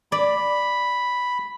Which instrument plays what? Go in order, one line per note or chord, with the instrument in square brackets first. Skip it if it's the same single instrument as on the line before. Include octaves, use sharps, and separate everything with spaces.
[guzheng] D5 [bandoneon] B5